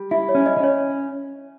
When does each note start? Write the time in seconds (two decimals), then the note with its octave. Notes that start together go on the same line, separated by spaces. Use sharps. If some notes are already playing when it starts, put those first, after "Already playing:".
Already playing: G3
0.11 E4 E5
0.29 C#5
0.35 C#4
0.46 D#5
0.57 C#4
0.64 C#5